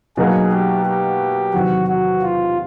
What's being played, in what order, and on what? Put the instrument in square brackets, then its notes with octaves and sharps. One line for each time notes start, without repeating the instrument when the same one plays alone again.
[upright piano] B2 F#3 A#3 D#4 F#4 [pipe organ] G#4
[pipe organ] G4
G4
[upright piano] E2 C3 D#3 F#3 [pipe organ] F#4
[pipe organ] F#4
F4